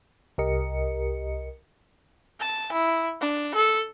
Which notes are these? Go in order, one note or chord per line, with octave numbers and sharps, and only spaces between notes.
C2 G4 A#4 D#5 C#7
A5
E4
D4
A4